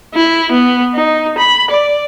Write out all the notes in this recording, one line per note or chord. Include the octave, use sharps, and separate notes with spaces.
E4
B3
D#4
B5
D5